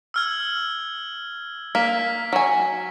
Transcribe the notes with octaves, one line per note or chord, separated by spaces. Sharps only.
E6 F6 G#6
A#3 B6
F#3 G#5